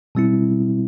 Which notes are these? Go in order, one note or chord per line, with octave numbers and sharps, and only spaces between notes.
B2 G3 C4 E4